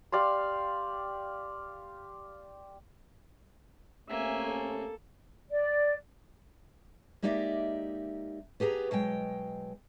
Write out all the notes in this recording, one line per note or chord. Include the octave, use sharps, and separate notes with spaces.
G4 D5 F5 C6
C3 A3 A#3 C#4 E5 G#5
A4
D5
G#3 A#3 D#4 G4 D5 E5
B3 G4 G#4 A5 A#5
B2 F#3 G#3 G5